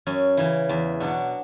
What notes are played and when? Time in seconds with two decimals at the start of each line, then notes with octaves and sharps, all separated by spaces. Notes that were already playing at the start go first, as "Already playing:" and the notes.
0.07 F#2 C#4
0.37 C#3 E3
0.69 E2
1.00 B2 F#3 D4